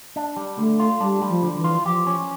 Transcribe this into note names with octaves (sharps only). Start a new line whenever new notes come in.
D4
G3
D3 A3
F4
G3 D4
G3
F3
D3
E3
F4
F3 G4
C#4